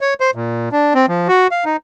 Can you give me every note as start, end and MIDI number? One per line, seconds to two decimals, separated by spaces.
0.01 0.14 73
0.20 0.31 72
0.35 0.69 46
0.72 0.94 62
0.95 1.06 60
1.09 1.28 53
1.28 1.47 66
1.51 1.64 77
1.65 1.77 63